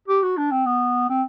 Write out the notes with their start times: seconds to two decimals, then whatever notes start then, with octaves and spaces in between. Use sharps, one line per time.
0.08 G4
0.23 F#4
0.37 D4
0.51 C4
0.66 B3
1.09 C4